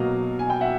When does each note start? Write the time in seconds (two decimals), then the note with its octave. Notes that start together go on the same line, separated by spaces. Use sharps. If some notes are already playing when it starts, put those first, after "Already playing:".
Already playing: B2 F#3 A#3 D#5 F5
0.39 G#5
0.50 G5
0.61 E5 F#5